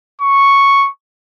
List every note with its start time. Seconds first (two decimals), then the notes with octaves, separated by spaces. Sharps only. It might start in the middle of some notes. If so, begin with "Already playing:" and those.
0.21 C#6